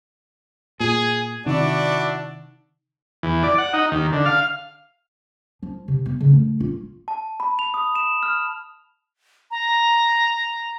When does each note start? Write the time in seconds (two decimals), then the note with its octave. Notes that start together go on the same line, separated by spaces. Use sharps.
0.80 A#2 G#4
1.46 C3 D#3 D4 E4 F#4 D5
3.23 E2
3.43 D5
3.58 F#5
3.73 D#4
3.92 D#2
4.13 D3
4.26 F5
5.63 F3
5.88 C3
6.06 B3
6.21 C#3
6.33 A3
6.60 F4
7.08 A5
7.40 B5
7.59 F7
7.74 D#6
7.95 E7
8.23 F6
9.51 A#5